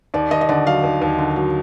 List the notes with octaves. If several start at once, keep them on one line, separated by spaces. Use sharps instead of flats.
D#2 D5
D#2 D#5
D#5
D3 D5
F#3 F5
D#2
D#2
D3
F#3